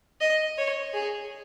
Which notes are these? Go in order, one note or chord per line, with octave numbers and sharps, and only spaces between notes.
D#5
C#5
G#4